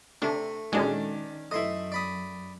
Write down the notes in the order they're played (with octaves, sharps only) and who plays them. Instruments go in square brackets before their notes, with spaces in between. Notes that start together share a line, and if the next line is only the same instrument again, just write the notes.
[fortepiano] C3 [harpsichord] A3 [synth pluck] D4
[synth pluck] A#2 G#3 [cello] D#3 [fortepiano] C#4 D4 F#4
[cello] F#2 [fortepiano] A3 E4 [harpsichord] D#5 C6
[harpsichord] D5 B5 D#6